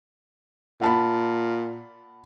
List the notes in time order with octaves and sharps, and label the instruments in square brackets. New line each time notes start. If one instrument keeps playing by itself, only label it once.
[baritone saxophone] A#2 [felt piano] F#5 A5 B5